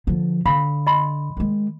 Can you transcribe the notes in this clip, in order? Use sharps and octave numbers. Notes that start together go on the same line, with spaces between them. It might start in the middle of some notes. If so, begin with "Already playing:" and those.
D3 F3
D3 F5 B5
D#5 B5 C6
D#3 G#3